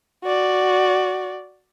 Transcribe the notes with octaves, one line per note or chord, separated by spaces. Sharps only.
F#4 D5